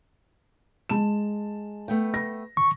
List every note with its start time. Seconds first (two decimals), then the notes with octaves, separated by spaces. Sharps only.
0.89 G#3 A5 E7
1.88 A3 B3 G5
2.14 A#6
2.57 C#6